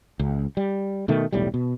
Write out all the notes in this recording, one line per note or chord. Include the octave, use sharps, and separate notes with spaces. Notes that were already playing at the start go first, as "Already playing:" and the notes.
C#2
G3
B2 D#3 A3
E1 B1 A2 G3
B2